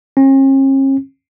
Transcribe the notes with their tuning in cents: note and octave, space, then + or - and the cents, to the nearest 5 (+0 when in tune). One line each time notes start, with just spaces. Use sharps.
C#4 -45